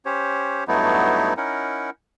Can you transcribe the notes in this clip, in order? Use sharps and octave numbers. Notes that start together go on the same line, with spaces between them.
C#4 G4 C5 C#5
G2 F#3 A3 B3 D#4 E4
C#4 D#4 E4 A#4 F#5